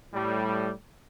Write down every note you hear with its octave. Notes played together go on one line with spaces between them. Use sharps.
A2 G3